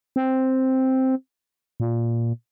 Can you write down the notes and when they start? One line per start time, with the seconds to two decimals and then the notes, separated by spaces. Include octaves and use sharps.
0.16 C4
1.80 A#2